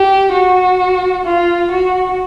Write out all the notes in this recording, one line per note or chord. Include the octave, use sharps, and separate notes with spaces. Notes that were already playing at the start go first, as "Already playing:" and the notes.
Already playing: G4
F#4
F4
F#4